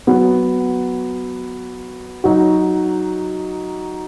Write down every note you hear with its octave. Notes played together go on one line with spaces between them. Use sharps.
F#3 B3 F#4
F#3 D#4 F#4